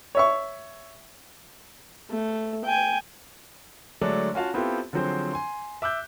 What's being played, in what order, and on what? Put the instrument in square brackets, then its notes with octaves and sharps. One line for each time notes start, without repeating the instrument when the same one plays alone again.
[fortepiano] C#5 E5 C#6
[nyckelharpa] A3
G5 G#5
[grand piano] D3 F#3 G#3 A3 D4
C#4 F4 F#4 F5 A5
B3 C4 E4 F4 G4 A4
D3 F3 F#3 C4 G#4 C5
G#5 C6
E5 D6 E6 F#6 G6